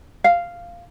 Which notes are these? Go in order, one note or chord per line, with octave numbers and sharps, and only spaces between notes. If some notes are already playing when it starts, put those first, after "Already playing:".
F5